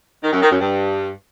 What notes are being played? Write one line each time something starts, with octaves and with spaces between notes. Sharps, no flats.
D#3
F#2
D#3
F#2
G2